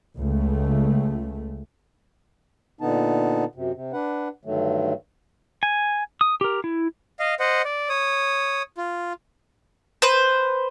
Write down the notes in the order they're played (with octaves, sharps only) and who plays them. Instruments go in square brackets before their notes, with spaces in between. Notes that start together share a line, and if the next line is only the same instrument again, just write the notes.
[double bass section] C#2 A3
[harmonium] A#2 D3 B3 D#4 A5
F#2 C3
C3
D4 B4 F#5
G2 D3 D#3 F#3 A3
[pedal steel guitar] G#5
D#6
G4 A#4
E4
[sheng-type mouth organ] D#5 F5
C5 D#5 F#5
D5
C#5 D#6
F4
[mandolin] B4 C5